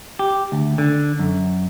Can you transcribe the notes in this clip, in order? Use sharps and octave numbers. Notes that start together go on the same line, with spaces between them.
G4
D2
D3
F#2